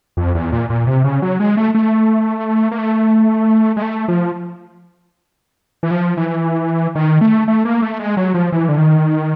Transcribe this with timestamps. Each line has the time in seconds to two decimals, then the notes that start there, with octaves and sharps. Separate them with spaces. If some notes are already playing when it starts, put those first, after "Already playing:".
0.17 F2
0.35 E2
0.52 A#2
0.70 A#2
0.87 C3
1.04 C#3
1.22 F#3
1.40 G#3
1.57 A3
1.75 A3
2.71 A#3
2.78 A3
3.77 G#3
3.82 A3
4.08 F3
5.83 E3
5.91 F3
6.17 E3
6.95 D#3
7.21 A3
7.48 A3
7.65 A#3
7.82 A3
7.99 G#3
8.17 F#3
8.34 F3
8.52 E3
8.69 D3
8.78 D#3